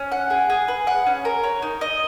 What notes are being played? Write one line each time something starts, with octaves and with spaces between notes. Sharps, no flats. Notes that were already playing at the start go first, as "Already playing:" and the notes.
Already playing: C#4
F#5
G#4
G#4
B4
F#5
C#4
A#4
C#5
D#4
D#5